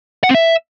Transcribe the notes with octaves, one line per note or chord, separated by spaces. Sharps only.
F#5
C4
E5